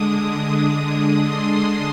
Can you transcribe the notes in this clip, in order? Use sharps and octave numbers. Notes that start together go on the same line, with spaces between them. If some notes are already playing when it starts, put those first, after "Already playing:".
Already playing: D3 G#3 D4 D#6
C6